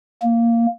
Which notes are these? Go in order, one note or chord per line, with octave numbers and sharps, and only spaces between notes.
A#3